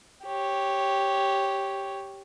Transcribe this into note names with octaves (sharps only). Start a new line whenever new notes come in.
G4 C#5